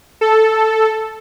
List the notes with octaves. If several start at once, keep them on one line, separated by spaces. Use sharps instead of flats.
A4